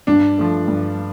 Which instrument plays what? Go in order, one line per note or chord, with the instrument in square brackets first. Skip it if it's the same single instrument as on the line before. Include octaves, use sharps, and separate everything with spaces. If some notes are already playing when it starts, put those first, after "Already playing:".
[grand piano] G2 [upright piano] D4
[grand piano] F3 A3
G2